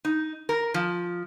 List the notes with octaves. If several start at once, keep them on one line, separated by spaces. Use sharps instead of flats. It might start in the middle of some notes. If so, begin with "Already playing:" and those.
D#4
A#4
F3